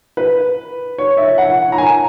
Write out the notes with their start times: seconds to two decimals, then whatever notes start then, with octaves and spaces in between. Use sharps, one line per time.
0.17 B4
0.98 C#5
1.17 E5
1.38 F#5
1.72 A#5
1.78 G#5